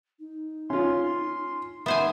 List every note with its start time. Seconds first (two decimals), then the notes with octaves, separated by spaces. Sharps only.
0.19 D#4
0.70 C#4 F4 C6
1.86 B3 D#4 C5 E5 G#5